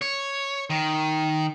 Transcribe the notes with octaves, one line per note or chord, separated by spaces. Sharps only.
C#5
D#3